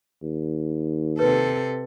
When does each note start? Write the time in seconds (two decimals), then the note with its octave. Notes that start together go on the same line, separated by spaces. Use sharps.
0.23 D#2
1.19 C3 A4 B4